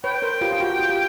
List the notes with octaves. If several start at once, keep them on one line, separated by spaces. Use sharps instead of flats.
B4 C#5 G5
A#4 C5
F4 G4
F4
F#4
F4
G4